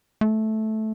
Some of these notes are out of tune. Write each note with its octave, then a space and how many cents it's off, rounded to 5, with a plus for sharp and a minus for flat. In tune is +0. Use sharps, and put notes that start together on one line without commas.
A3 -10